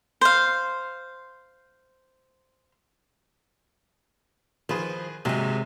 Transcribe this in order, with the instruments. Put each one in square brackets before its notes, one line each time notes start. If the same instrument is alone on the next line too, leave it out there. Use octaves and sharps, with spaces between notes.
[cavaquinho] C5 F5
[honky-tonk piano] D#3 G#4 B4 [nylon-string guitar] F3
[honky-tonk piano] D#2 G#2 F#3 [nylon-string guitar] C3 G#3